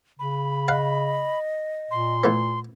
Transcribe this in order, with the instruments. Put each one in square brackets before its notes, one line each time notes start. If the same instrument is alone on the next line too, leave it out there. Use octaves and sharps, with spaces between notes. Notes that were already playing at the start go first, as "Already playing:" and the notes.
[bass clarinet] C#3 [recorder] B5
[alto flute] D#5 [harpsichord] F5 F#5
[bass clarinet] A#2 [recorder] C6
[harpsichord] E3 A3 B3